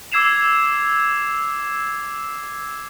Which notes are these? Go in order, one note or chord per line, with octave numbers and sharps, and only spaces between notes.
D6 E6 G#6 C7 E7 F7